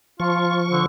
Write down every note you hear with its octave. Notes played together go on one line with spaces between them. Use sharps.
F3 F4 C#6
D3